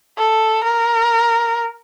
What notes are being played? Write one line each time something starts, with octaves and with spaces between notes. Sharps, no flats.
A4
A#4